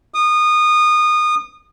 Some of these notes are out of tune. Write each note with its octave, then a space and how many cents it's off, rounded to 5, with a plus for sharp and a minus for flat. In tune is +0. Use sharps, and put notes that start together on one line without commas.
D#6 -25